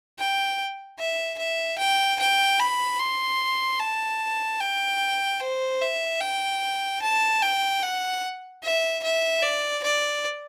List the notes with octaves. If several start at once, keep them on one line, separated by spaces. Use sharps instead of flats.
G5
E5
E5
G5
G5
B5
C6
A5
G5
C5
E5
G5
A5
G5
F#5
E5
E5
D5
D5